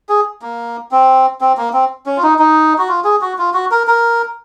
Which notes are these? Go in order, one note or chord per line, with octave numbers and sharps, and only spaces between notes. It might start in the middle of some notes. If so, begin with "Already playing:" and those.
G#4
A#3
C4
C4
A#3
C4
C#4
F4
D#4
D#4
F#4
F4
G#4
F#4
F4
F#4
A#4
A#4